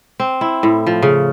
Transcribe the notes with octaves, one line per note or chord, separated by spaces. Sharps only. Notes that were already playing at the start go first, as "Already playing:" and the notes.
C4
E4
A2
F3
C#3